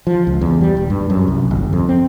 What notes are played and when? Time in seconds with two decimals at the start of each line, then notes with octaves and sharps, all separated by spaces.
0.07 F3
0.27 C#2
0.41 E2
0.61 G3
0.77 D#1
0.90 G2
1.10 F#2
1.28 C2
1.51 G1
1.73 F2
1.89 C4